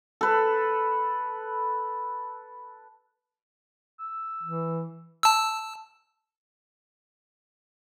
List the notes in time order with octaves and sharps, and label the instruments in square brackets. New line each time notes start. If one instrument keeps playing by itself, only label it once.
[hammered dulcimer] A4 B4
[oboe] E6
[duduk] E3
[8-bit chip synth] A5 E6